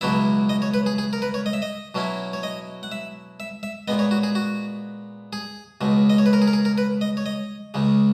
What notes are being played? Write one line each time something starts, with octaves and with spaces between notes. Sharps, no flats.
C#2 B2 F#3 B3 E4 E5
D#5
C#5
B4
G#4
G#4
A#4
B4
C#5
D#5
E5
D#5
B2 F#3 C#4 E4
C#5
D#5
F#5
E5
E5
E5
A#2 G#3 B3 D#5
C#5
F#4
G#4
F#4
G#4
C#2 B2 G#3
D#5
C#5
B4
A#4
G#4
A#4
G#4
A#4
B4
D#5
C#5
D#5
C#2 C#3 G#3